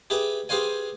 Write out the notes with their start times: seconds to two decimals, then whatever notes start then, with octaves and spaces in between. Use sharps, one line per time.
0.10 G4 G#4 B4 E5
0.49 G4 G#4 B4 C5 F5 G#5